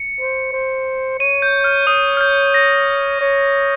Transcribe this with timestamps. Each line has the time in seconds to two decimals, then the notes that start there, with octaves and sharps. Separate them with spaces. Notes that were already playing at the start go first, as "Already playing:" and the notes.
Already playing: C#7
0.20 C5
0.53 C5
1.20 C#5 D#7
1.42 G6
1.64 F6
1.87 C#5 D#6
2.17 F6
2.21 G6
2.54 A#6
3.21 C#5